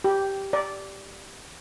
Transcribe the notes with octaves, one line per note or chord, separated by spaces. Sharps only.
G4
D5